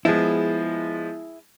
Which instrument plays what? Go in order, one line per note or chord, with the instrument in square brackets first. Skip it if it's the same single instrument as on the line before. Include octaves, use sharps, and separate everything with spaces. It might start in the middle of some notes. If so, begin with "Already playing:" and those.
[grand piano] F3 G#3 B3 [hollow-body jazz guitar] E4 G#4